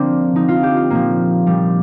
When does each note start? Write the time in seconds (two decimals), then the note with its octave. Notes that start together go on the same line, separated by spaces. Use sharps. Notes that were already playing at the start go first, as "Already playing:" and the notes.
Already playing: D3 F3 A#3 C4 D4
0.35 D3 F3 D#4
0.48 F4
0.63 G4
0.77 F4
0.90 A#2 F3 A#3
1.46 A#2 F3 G3